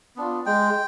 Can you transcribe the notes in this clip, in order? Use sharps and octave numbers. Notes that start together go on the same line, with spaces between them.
B3 D4 F4
G#3 G5